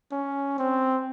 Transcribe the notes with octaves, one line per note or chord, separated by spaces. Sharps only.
C#4
C4